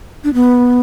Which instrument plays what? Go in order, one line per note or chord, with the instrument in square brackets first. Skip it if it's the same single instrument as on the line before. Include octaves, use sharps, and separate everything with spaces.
[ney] D4
B3